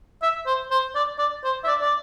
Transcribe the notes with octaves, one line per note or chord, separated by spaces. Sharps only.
E5
C5
C5
D5
D5
C5
E5
D5
D5